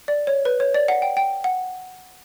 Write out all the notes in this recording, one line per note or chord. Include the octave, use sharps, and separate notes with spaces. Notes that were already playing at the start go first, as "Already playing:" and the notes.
D5
C#5
B4
C#5
D5
F#5
G5
G5
F#5